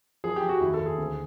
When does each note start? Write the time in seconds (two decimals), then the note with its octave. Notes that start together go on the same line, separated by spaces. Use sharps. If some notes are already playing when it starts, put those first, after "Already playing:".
0.24 F3 G#4
0.36 G4
0.43 F3
0.49 F#4
0.61 D#2 E4
0.74 A4
0.79 D#2
0.86 G#4
0.98 D2